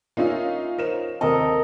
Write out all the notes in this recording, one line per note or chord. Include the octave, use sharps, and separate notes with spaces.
A#3 C#4 D#4 F4 E5
A#4 C5 E7
D#2 C4 A4 A#4 D#5